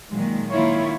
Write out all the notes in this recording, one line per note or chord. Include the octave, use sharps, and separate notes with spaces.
A#2 D#3 F#3 G#3
D#3 A#3 E4 F4 C#5